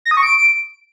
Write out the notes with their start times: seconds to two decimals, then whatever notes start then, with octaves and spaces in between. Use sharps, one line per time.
0.05 A#6
0.11 D#6
0.17 C#6
0.23 D7